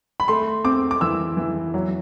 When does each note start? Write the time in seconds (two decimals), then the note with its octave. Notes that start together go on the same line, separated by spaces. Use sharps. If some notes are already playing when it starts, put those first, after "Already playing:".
0.20 B5
0.28 A3 C6
0.64 C4 D6
0.91 D6
1.01 E3 E6
1.37 E3
1.74 F#3